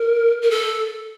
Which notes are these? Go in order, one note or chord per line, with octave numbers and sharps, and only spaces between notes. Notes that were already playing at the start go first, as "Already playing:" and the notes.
Already playing: A#4
A#4
A4